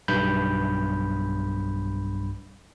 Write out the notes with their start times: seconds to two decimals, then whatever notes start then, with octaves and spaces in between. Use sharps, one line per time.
0.08 B1 G2 B5 G6